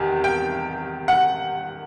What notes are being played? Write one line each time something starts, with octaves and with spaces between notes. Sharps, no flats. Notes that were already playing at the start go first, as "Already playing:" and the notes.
Already playing: E2 C3 D#3
G5
F#5